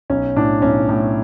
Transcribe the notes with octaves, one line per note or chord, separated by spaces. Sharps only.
B1 C#4
A2 D4
B1 C#4
A2